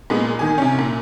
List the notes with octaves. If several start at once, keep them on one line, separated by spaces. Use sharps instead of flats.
A#2 G#3 B3
D#3 G#5
C3 C#4
A#2